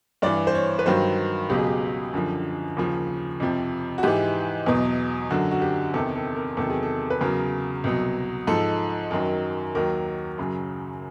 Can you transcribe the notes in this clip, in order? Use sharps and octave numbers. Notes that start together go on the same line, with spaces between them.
G2 E3 D5
C5
C#5
B4
G2 D#3 F#3 C5
C#2 B2 F#3 G4
G#4
G4
F#2 D3 F3
D#2 C#3 F3
F2 C3 F3
F#4
G#2 E3 G4
E2 B2 F#3
F#2 D3 F#3 F#4
F#4
G4
E2 C3 D#3 A4
A4
A#4
E2 C3 D#3 F#3 A4
G#4
A4
B4
E2 C#3 F#3 A#4
C2 B2 F#3
G#2 F3 A4
F#2 D#3 F#3
D#2 D#3 F#3 A#4
F#2 C#3 F#3